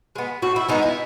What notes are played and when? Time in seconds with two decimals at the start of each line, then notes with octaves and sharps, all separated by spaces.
0.15 G#3 B3
0.42 A2 F#4
0.56 E4
0.69 G#3 B3 D#4
0.82 E4